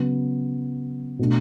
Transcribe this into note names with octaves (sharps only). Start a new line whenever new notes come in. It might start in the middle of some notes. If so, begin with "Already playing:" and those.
Already playing: C#3 F#3 B3
B2 A3 D4